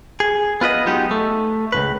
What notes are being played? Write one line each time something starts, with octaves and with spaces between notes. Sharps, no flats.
G#4
B3 F4 B4 D#5
F#3 G#3 B3 D#4 G4
A3
C#2 B2 B4